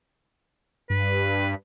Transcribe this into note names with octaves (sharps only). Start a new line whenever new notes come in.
G2 B4